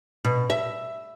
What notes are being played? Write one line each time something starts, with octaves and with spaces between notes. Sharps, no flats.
B2
E5